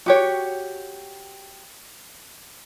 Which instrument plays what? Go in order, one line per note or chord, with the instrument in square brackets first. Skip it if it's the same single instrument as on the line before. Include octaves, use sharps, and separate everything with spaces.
[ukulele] F#4 G4 C#5